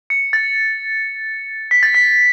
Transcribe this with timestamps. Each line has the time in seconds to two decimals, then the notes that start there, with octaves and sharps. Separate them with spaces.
0.10 C#7
0.33 A6
1.71 B6
1.83 A6
1.94 B6